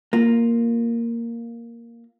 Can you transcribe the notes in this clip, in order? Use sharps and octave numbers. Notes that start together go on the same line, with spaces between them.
A#3 F4